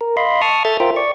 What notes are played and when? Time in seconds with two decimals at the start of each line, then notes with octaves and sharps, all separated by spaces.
0.01 A#4
0.17 D#5 F5 B5 C6
0.42 A5 C#6 D#6 F6
0.65 A4 E5 F6 G6 A6
0.80 F4 A#4 C5 E5 G5
0.96 D5 C#6